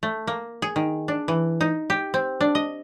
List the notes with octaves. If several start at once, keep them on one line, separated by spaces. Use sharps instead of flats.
A3
A#3
G#4
D#3
D4
E3
D#4
G4
C4
D4
D#5